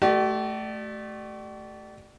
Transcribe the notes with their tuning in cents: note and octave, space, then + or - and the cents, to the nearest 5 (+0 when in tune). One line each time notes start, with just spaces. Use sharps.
A3 -10 G4 -45 D5 +25